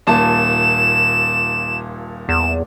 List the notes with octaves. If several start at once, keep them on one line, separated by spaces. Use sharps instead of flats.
D#1 A#2 A5 E7
E2 E7